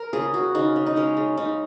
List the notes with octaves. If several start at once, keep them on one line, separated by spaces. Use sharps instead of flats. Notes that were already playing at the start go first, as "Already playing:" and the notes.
Already playing: A#4
C#3 G#4
C#3 F#4
C#3 D#4
C#3
D#4
G#3 C#4
C#3
C#3 D#4